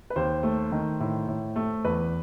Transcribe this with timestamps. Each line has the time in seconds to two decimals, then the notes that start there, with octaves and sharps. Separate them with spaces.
0.10 B4
0.16 D#2 C5
0.43 A3
0.72 D#3
1.00 A2
1.28 A2
1.56 A3
1.84 E2 B4